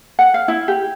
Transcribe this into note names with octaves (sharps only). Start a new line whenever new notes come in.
F#5
F5
E4
G4